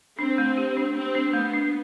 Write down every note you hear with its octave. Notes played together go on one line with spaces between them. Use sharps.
C4 D4
A3
G4
D4
C4 G4
D4
A3 B3
D4